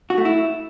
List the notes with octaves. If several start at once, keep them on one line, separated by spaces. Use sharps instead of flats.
F#4
A3
E4